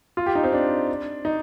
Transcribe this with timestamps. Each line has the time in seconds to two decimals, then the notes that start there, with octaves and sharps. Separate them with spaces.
0.17 F4
0.26 G4
0.35 D#4
0.43 C4
0.53 D4
1.25 D#4